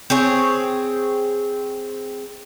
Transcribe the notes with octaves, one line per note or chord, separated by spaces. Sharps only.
C4 G#4 C#5